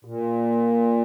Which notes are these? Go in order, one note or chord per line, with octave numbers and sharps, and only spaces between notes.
A#2